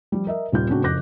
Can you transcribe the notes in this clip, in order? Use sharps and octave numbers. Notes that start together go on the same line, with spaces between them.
F3 G3
A#4 D#5 E5
D#1 G3 F4 G6
A2 C#3 C4 D4 F#4
F#1 F2 D6 F#6 G6 A#6